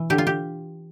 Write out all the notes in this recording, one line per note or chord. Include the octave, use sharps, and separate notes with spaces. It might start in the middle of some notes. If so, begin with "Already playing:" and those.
Already playing: B2 E3
D3 G4
F4
G4